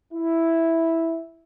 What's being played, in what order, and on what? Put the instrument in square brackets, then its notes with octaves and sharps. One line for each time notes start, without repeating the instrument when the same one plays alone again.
[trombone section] E4